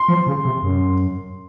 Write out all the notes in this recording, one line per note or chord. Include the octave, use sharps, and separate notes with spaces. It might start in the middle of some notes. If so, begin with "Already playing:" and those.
Already playing: C6
F3
C#3
C3
F#2